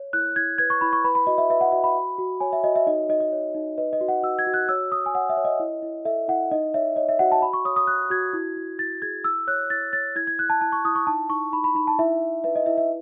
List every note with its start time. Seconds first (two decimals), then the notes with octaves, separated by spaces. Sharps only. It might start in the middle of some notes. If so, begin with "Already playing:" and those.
Already playing: C#5
0.13 E4 F#6
0.36 E4 G#6
0.58 B4 G#6
0.70 C#6
0.81 E4 B5
0.93 C#6
1.04 B4 B5
1.15 B5
1.27 F#4 D#5
1.38 E5
1.50 B4 E5
1.61 F#5
1.72 F#4 E5
1.84 B5
1.95 F#4
2.19 F#4
2.40 C#5 G#5
2.53 E5
2.64 F#4 D#5
2.76 E5
2.87 D#4 D#5
3.09 D#4 D#5
3.20 D#5
3.32 C#5
3.55 D#4
3.78 B4 D#5
3.93 D#5
4.01 F#4
4.08 F#5
4.23 F#4 E6
4.39 G#6
4.47 F#4
4.54 F#6
4.69 C#5 E6
4.92 F#4 D#6
5.06 G#5
5.14 C#5 F#5
5.29 E5
5.37 C#5
5.45 D#5
5.60 E4
5.82 E4
6.05 A4 E5
6.28 E4 F#5
6.51 D#4 D#5
6.74 C#5 E5
6.96 C#5 D#5
7.09 E5
7.19 F#4 F#5
7.32 A5
7.42 F#4 B5
7.53 C#6
7.65 C#5 D#6
7.76 D#6
7.87 C#5 F#6
8.10 F#4 G#6
8.33 E4
8.57 E4
8.79 E4 A6
9.02 G#4 G#6
9.24 E4 E6
9.48 C#5 F#6
9.70 E4 A6
9.93 C#5 A6
10.16 E4 G#6
10.27 G#6
10.39 E4 F#6
10.50 A5
10.61 E4 A5
10.72 C#6
10.85 E4 D#6
10.95 C#6
11.07 D#4 A5
11.29 D#4 C#6
11.53 D#4 B5
11.64 B5
11.75 D#4 B5
11.87 A5
11.99 E4 E5
12.21 E4
12.44 B4 E5
12.56 D#5
12.66 E4 E5
12.78 E5